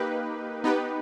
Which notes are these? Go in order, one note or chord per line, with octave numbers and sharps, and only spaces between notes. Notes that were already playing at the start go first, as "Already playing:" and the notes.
Already playing: A#3 D#4 G4 B4
B3 D#4 G4 B4